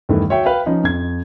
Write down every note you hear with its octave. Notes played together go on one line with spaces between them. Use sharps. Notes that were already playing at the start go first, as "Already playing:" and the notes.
E2 G2 D#3 A3 B3 E4
F#4 C#5 E5 G5
B4 F5 G5
F3 C#4 D#4
F2 G#6